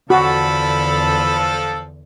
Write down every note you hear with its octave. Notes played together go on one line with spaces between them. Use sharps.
E2 D3 F3 F#4 A4 B5